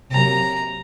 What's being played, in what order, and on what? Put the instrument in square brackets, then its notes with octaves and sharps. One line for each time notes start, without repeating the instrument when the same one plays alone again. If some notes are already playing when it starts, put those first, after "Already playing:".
[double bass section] C3 F#3 A#3 [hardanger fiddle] A#5